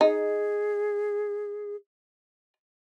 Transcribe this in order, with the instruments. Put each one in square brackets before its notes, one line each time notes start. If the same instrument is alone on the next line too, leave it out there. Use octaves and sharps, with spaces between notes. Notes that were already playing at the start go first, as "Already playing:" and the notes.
[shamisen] D#4 [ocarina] G#4